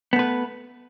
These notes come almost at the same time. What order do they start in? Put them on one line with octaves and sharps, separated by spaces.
B3 A3 B4